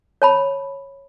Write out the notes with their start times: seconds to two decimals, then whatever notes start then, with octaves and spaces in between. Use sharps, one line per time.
0.22 C#5 A5 B5